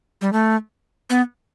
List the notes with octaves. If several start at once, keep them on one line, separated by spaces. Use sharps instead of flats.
G3
A3
B3